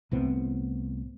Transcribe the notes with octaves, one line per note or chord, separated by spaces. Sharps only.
C2 A2 B3 C4